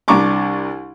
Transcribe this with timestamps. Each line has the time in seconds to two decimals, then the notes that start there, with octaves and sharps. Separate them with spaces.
0.08 C2 D4 A#5 C#6 D6